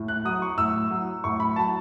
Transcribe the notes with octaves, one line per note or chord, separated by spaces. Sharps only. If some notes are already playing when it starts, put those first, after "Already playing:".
Already playing: A2
F#6
F#3 D#6
C#6
A2 E6
F#3
A2 C#6
B5
F#3 A5